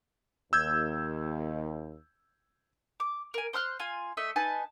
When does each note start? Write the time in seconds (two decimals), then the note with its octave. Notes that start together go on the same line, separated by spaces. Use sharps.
0.53 D#2 E6 G6 G#6
3.00 D6
3.34 A#4 G#5
3.53 C5 C6 F6 F#6
3.79 F4 G#5
4.17 A3 D#5 E5
4.36 D#4 B4 G#5 A5